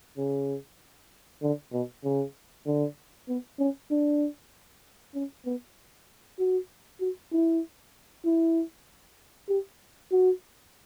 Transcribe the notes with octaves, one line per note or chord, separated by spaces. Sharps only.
C#3
D3
B2
C#3
D3
B3
C#4
D4
C#4
B3
F#4
F#4
E4
E4
G4
F#4